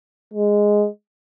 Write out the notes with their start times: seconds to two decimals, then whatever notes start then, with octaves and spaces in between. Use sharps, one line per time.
0.34 G#3